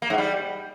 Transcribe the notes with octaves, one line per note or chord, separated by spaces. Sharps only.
A#3
G#2
G3